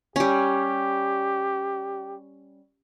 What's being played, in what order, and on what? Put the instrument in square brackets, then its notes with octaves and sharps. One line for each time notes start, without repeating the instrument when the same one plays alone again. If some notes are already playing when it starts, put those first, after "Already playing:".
[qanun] G3 C#4 [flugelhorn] G4